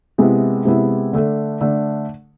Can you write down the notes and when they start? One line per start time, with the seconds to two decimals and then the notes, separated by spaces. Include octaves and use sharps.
0.18 C3 G#3 B3 E4
0.65 C3 G#3 B3 E4
1.13 D3 A3 D4
1.61 D3 A3 D4